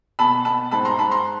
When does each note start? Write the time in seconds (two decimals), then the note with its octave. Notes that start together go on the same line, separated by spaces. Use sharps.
0.19 B2 A5 B5
0.45 B2 A5 B5
0.71 G#2 A5 B5
0.85 A#5 C6
0.98 G#2 A5 B5
1.11 A#5 C6